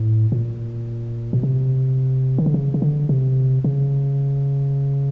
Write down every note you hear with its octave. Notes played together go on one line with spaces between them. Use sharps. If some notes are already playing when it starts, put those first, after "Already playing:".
Already playing: A2
A#2
B2
C3
D#3
D3
C#3
C#3
D3
C3
C#3